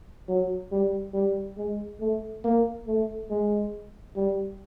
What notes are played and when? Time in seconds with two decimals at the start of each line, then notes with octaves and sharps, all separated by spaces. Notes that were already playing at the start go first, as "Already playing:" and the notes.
0.28 F#3
0.72 G3
1.14 G3
1.57 G#3
2.00 A3
2.44 A#3
2.87 A3
3.30 G#3
4.16 G3